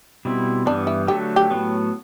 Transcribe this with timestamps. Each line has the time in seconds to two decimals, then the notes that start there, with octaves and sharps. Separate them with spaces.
0.25 B2 G3 C4 E4
0.66 G2 E3 G3 B3 D4
0.87 E4
1.08 D3 F#3 A3 G4
1.36 G4
1.50 A2 F#3 B3